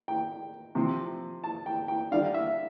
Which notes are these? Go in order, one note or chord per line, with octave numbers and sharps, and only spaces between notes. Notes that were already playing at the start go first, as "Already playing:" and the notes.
G5
C3 F3 C4
A5
G5
G5
D3 G3 D4 F5
E5